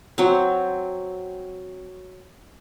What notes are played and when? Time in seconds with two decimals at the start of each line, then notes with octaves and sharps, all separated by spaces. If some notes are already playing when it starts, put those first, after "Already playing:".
0.18 F#3 C4